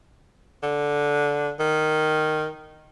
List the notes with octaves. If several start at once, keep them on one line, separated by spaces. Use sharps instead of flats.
D3
D#3